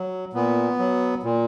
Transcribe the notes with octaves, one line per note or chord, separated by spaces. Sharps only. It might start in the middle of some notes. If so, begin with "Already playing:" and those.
Already playing: F#3
A#2 B3
F#3
A#2